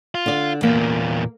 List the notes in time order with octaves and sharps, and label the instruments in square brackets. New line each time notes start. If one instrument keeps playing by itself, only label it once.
[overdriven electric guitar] F4
[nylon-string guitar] D3 D5
[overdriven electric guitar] E2 A#2 [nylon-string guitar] A#3